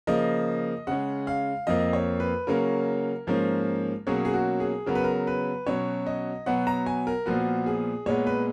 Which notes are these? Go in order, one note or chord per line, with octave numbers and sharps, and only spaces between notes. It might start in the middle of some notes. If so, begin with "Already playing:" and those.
C#3 F3 A#3 D#5
C#3 G#3 C#4 F#5
F5
F2 F3 A#3 D#5
C#5
B4
C#3 F#3 A#3 C#4 A#4
G#2 F3 A#3 C#4
B2 F#3 A#3 C#4 G#4
G#4
F#4
G#4
C#3 F#3 B3 A#4
B4
A#4
B4
B2 F#3 C#4 C#5
D#5
B2 F#3 B3 F#5
A#5
G#5
A#4
A#2 F3 B3 F#4
G#4
A#2 G#3 B3 C#5
B4